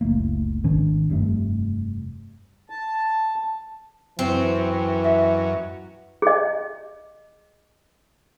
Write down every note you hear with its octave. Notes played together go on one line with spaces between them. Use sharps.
F#1 C#2 A3 A#3
G#1 D#3 C#4 D4
F1 G2 A3
A5
F#2 E3 C4
D#5 E5 F#5
G#4 D#5